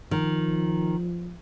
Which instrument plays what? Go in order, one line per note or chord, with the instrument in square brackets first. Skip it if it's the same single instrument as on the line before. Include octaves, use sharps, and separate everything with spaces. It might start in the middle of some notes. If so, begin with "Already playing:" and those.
[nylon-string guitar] D#3 [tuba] F3